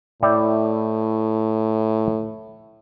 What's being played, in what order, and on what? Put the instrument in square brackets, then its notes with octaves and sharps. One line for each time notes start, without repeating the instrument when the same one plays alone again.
[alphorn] A2 [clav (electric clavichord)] E4 D5 G5